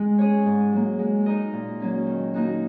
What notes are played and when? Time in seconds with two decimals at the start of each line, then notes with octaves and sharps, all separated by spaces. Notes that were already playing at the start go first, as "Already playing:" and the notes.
Already playing: G#3
0.18 C#4 G#4 C#5
0.46 G#2
0.73 F#3 A#3
0.99 G#3
1.26 D#4 A#4 D#5
1.53 A#2
1.80 F#3 A#3 C#4
2.06 D#3
2.34 A#3 D#4 F#4